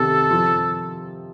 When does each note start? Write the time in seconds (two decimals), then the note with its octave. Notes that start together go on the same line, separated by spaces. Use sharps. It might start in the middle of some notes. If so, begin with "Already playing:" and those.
Already playing: C3 D#3 A4
0.31 F3